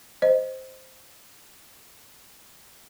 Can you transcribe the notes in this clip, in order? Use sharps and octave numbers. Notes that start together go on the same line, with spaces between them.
C5 D#5